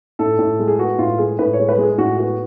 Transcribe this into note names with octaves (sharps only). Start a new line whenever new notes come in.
A2 A4
A2
G#3
G#4
B3 F#4
A2 F4
G#3 G#4
A2 B4
C#5
G#3
B4
G#3
G#4
A2 F#4
B3 F#4